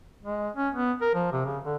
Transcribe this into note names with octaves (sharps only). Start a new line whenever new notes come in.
G#3
C#4
B3
A#4
F3
C3
C#3
D3